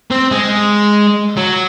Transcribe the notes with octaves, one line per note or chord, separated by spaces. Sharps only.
C4
G#3
F#3